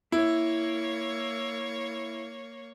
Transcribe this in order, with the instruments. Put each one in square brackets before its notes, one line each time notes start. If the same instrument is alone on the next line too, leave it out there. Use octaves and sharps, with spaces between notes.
[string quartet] A#3 C#5 [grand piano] E4